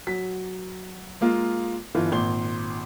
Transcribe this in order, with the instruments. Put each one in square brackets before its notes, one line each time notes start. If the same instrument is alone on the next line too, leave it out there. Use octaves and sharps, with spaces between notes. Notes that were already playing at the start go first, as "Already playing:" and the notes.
[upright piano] F#3 B6
G#3 A#3 F4
G1 E3 F4
G#1 A#2 C6 G7